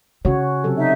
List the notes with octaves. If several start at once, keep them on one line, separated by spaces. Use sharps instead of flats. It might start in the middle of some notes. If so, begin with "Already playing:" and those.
C#3 C#4 F#4 C#5
C3 F#3 A4
D#4 E5